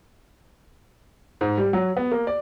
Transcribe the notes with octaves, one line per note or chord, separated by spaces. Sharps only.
G#2
G3
F#3
B3
A#3
D5